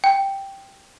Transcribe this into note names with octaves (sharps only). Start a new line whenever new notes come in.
G5